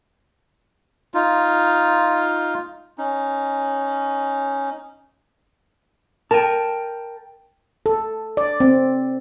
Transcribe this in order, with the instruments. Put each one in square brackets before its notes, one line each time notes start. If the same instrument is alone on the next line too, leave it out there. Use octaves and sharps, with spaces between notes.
[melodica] D#4 F4
[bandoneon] C#4 D#4
[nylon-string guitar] A#4 [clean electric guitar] G5 A5
[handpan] A4
D5
C4